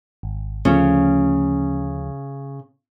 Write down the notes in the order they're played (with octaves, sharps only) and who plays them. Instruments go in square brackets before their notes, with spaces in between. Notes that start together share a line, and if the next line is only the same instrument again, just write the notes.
[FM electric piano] G#1
[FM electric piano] D2 F3 A3 [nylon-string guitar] C#3 C#4